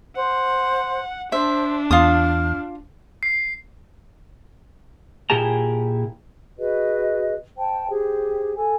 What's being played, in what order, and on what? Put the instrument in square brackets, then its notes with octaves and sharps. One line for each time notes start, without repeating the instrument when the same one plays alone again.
[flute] C5 [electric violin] F#5
[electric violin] D4 [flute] C5 [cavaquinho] E5
[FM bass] E2 [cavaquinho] F4 D#6 [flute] F6
[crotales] C7
[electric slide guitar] A#2 E4 G4 G#4 A5 A#5
[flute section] F#4 G#4 B4 D#5
C5 G5 A5
G4 G#4 C5
A4 G#5